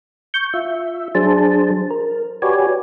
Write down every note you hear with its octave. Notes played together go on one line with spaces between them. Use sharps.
C#6 G6
F4 E5
F#3 D4 G#4 C5 A5
A#4
F#4 G4 B4 C#5 D5 G#5